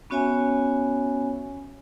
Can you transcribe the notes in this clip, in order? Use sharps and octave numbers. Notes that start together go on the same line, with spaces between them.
B3 C#4 F#4 C#5 E5 G#5